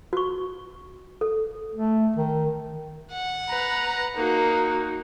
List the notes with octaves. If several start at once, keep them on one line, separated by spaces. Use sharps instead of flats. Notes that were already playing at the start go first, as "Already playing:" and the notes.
F#4 C#6
A4
A3
D#3
F#5
B4 A#5
A#3 D#4 F#4